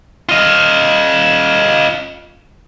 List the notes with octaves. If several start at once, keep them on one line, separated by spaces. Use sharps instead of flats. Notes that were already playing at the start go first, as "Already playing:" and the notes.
F4 D#5